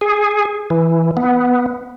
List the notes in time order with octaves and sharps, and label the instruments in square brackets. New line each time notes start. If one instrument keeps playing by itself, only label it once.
[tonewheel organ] G#4
E3
B3